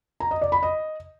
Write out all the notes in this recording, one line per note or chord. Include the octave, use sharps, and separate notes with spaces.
A#5
D#5
D5
B5
D#5